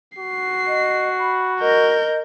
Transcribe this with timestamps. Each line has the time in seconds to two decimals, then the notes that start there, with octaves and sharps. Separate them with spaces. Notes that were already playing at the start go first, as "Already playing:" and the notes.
0.18 F#4 C7
0.67 D#5
1.18 B5
1.60 A#4 D#5 G6